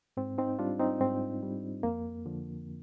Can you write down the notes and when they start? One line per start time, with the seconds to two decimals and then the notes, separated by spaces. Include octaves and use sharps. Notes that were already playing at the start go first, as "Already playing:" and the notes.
0.17 G#2 C4
0.38 C4 D#4
0.59 G3 D4 F4
0.80 C4 D#4
1.01 G#2 C4
1.43 G3
1.83 F2 A#3
2.26 D3 F3